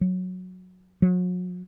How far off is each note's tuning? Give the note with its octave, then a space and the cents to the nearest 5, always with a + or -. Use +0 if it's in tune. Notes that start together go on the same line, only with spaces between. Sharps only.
F#3 -10
F#3 -40